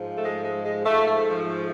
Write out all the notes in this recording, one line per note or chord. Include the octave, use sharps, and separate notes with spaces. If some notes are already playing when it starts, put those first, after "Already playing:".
Already playing: G#2 F3
A3
G#3
G#3
G#3
G#2 F3 A3
A3
F3